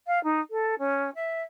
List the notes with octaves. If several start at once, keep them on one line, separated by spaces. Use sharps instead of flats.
F5
D#4
A4
C#4
E5